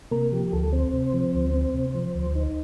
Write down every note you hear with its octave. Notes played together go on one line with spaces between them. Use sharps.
C3 A#3 A#4
F3 G4
D2 A4
C4 C5
C3
F3
D2
C4
C3
F3
D2
D#4